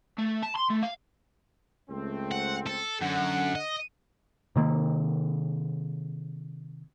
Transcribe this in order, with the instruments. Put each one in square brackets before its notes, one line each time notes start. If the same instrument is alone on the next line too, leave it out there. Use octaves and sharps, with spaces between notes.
[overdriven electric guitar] A3
A5
C6
A3
F5
[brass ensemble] C#2 A3 C4
[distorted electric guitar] F#5
A4
[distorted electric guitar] F#2 [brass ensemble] D3 F#5
[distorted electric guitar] D#5
[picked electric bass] C3 D#3 A#3